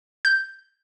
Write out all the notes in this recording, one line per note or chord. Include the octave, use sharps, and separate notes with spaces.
G6